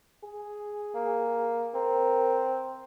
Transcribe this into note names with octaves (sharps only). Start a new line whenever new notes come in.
G#4
A#3
C4 A#4